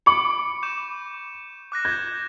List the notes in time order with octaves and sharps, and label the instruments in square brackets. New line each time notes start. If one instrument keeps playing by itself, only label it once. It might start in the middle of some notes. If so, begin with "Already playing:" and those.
[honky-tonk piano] B5 D6 F#7 [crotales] C#7
[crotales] C#6 G6 E7
D6 F#6 A#6
[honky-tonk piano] G6 [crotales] G#6